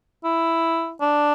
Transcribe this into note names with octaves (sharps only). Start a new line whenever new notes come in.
E4
D4